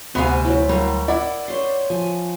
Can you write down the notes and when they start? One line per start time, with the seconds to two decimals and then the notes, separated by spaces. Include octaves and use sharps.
0.15 D2 C3 B3 F5 G#5
0.44 F#3 E4
0.69 F#3 G3 A#4 F5
1.08 E4 D5 F#5
1.48 C5 C#5 C6
1.90 F3 G#5